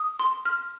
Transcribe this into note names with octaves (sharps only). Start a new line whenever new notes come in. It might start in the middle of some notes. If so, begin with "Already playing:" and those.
Already playing: D#6
C6
F6